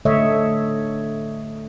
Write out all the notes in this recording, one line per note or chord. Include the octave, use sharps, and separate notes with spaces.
D3 A3 C#5 D#5 E5